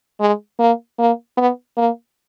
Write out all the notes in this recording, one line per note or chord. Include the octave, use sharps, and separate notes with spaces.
G#3
A#3
A#3
B3
A#3